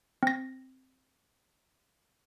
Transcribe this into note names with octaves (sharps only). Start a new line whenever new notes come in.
C4 A#6